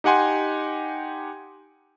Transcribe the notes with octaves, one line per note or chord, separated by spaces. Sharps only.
D#4 G4 F#5 G#5 C6